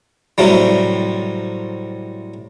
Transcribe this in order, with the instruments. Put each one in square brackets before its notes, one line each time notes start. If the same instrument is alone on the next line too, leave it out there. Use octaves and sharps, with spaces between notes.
[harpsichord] A2 C3 F#3 G3